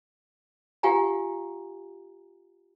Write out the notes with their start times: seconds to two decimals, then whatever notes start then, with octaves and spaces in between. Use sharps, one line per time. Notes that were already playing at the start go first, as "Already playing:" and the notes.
0.83 F4 G4 F5 F#5 G#5 A#5